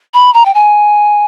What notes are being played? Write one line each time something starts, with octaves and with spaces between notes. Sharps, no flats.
B5
A#5
G5
G#5